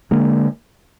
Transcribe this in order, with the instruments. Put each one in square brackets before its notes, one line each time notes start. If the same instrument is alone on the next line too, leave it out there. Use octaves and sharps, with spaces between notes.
[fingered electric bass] D3 G#3 A#3